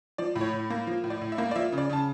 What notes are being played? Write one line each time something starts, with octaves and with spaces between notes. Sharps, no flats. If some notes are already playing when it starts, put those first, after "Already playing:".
F3 D5
A2
C#5
A2
A#3
F3
A2
D5
A2
E5
A#3
D5
F3 E5
C#3
D5
C#3 A5